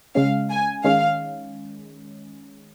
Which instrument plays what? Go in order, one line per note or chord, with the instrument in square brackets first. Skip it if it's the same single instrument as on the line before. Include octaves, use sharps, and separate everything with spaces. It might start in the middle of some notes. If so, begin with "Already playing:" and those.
[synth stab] C#3 G#3 C#4 [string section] F5
[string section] G#5
[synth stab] D#3 G#3 C#4 [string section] F5